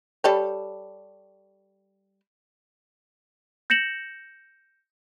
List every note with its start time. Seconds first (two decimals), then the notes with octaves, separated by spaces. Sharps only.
0.24 G3 A4 C#5
3.70 G6 A#6 C#7 E7 F#7